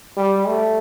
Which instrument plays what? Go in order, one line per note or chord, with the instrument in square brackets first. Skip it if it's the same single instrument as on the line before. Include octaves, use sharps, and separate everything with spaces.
[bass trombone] G3
A3